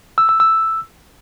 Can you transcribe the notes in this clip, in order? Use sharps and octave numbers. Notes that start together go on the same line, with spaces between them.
E6
E6
E6